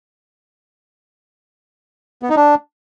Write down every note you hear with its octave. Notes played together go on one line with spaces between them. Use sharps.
B3
D#4
D4